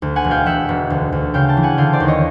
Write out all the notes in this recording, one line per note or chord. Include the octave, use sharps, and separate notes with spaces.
D2
F#5 G#5
E1
F5 G5
E1 E5 F#5
E1
D2
D2
C#3 F5 G5
G5 A5
E3
F#5 G#5
D3 F5 G5
C5 D5
D#2
C#5 D#5